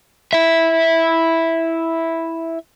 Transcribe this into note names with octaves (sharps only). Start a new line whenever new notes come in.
E4 E5